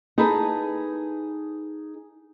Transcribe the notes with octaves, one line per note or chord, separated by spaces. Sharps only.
D#4 G#4 A4 B4